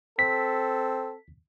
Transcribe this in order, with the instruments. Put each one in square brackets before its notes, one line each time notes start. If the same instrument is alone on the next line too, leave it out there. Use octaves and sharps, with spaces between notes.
[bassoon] C4 [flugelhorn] A4 [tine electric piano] B6